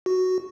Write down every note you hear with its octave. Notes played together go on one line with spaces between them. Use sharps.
F#4